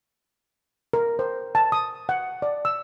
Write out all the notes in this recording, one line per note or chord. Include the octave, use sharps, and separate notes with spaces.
A#4
C5
A5
D#6
F#5
D5
E6